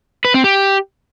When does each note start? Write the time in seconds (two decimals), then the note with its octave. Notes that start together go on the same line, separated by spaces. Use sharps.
0.25 B4
0.34 C4
0.44 G4